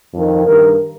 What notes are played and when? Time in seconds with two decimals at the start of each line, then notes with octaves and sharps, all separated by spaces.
0.14 F2 D#3
0.46 G2 D#3 A#4